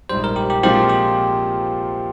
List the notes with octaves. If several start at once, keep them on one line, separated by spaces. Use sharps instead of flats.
A#1 G#2 G3 C5
A#4
G4
G4
A#2 F3 G#3 C4 F4 G4
G4